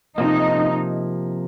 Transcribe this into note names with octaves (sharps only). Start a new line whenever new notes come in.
C3 F3 A#3 D#4